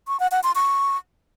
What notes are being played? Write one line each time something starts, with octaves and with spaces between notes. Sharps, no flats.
C#6
F#5
F#5
C6
C#6